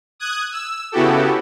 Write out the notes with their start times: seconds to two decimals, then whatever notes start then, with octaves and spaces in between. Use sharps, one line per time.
0.20 D#6 F#6 G#6
0.52 E6
0.92 C#3 B3 E4 F#4 G4 A4